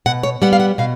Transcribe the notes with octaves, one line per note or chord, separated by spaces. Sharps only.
B2 F#5
C#5
G3 B3 F#5
F5
F#5
B2 F5